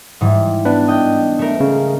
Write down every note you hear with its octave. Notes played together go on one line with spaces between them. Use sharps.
G#2 E3 G3
B3 D4 B4
D#5 G5
A3 A#4
C#3